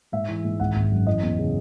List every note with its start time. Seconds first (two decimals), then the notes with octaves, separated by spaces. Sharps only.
0.12 G#2 E5
0.29 E3
0.44 G#2
0.60 G#1 F#5
0.76 G#1
0.91 F#2
1.07 E3 D#5
1.22 E2
1.38 C#3